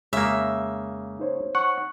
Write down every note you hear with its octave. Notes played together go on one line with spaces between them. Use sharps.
F2 C#3 G#3 A#3 C#4 E5
D#4 C5 C#5
F#5 C#6